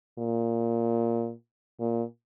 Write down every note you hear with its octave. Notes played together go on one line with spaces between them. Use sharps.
A#2
A#2